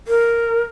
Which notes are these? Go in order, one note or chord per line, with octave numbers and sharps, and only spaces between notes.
A#4